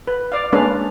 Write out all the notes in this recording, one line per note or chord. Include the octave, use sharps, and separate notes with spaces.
B4
D5 F5
G#3 A#3 C#4 D4 B4 F5